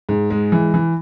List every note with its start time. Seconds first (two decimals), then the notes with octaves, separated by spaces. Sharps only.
0.09 G#2
0.30 G#3
0.52 E3
0.74 E3